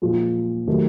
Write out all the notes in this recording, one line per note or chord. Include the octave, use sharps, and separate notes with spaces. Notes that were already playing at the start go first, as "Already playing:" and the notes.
A#2 F3 G#3
C3 D#3 F#3 A3